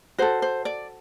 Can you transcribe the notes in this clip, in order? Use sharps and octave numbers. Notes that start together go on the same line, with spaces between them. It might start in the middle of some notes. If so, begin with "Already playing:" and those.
F#4 A4 C5
C5
D5